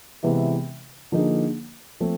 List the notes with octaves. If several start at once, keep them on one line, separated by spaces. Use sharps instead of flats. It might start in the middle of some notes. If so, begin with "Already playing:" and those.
C3 E3 G#3 B3 E4
D3 F3 A#3 D#4 G#4
F3 A3 C4